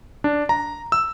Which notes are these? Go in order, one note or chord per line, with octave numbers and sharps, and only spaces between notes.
D4
A#5
E6